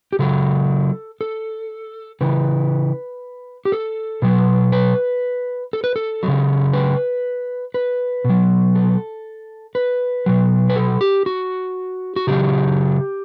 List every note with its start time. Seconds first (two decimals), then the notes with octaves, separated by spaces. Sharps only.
0.13 G4
0.19 C#3 F#3 A4
1.21 A4
2.21 C#3 E3 B4
3.65 G4
3.72 A4
4.22 B2 F#3
4.72 B4
5.73 A4
5.84 B4
5.96 A4
6.23 F#3
6.28 C#3
6.73 B4
7.74 B4
8.24 B2 F#3
8.75 A4
9.75 B4
10.26 B2 F#3
10.69 B4
10.76 A4
11.01 G4
11.26 F#4
12.16 F#4
12.27 C#3 F#3 G4